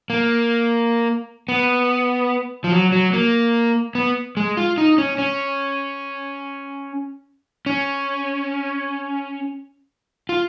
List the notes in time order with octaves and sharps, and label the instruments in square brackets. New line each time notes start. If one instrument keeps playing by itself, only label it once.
[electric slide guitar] A#3
B3
F3
F#3
F#3
A#3
B3
G#3
F4
D#4
C#4
C#4
C#4
F4